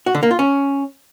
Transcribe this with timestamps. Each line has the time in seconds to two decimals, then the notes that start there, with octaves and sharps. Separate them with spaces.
0.06 F#4
0.15 D3
0.23 A#3
0.31 F4
0.39 C#4